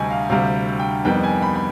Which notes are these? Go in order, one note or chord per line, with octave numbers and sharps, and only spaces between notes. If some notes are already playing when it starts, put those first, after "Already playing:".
Already playing: D2 C3 G3 D#5 G#5
F5
D2 C3 G3 F5
G5
F2 D#3 G3 B3 G5
G#5
B5
B5